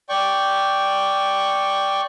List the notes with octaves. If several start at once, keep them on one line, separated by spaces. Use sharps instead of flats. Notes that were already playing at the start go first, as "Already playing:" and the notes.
D5 G5 C#6